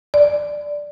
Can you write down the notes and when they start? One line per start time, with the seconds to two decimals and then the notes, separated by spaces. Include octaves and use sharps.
0.14 D5